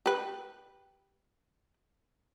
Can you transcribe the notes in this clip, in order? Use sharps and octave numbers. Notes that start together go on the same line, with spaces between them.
G4 B4